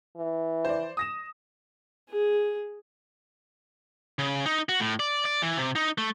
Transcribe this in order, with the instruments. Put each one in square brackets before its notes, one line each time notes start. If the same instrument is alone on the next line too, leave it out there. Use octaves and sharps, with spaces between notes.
[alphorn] E3
[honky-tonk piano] C5 D5
D#6 A#6 E7
[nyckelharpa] G#4
[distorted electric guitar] C#3
D#4
F#4
A2
D5
D5
E3
C3
D#4
A3